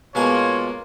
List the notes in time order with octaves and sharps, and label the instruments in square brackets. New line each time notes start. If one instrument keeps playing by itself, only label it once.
[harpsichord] B2 G#3 G#5 [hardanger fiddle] A#3 [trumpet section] F4 [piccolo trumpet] C#5